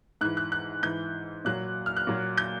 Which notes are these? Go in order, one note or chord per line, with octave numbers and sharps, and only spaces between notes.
G#2 E3 F#6
F#6
F#6
G#2 E3 G6
A#2 F#3 F#6
F6
F#6
A#2 F#3
G6